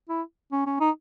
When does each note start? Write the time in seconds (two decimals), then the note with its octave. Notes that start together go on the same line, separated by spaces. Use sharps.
0.09 E4
0.52 C#4
0.66 C#4
0.80 D#4